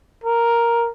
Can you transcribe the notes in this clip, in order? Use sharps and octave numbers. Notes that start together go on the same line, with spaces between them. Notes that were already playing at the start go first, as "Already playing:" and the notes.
A#4